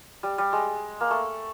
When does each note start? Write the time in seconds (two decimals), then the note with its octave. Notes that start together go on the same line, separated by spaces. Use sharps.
0.23 G3
0.38 G3
0.53 G#3
1.01 A#3
1.11 A3